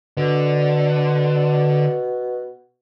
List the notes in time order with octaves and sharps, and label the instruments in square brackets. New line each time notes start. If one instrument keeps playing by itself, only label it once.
[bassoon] B2 [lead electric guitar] D3